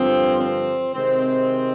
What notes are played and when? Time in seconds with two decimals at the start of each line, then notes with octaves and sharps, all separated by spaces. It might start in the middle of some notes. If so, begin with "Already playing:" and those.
Already playing: G2 D3 F3 C4
0.39 C4
0.94 C3 D#3 G#3 C4